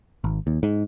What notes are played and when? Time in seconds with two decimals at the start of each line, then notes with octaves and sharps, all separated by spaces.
0.24 G#1
0.47 D#2
0.63 G#2